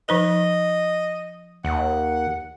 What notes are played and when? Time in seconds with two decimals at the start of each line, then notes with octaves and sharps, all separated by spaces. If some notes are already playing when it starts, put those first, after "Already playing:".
0.09 F3 D#4 B4 D#5
1.64 D#2 F#5